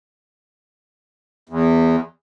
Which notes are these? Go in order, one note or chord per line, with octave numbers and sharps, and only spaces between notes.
E2